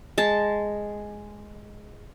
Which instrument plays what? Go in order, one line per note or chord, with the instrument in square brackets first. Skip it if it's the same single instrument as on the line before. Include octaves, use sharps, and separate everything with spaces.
[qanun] G#3 A5